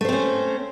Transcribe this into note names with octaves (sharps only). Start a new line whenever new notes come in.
A3 C4 C#4 C5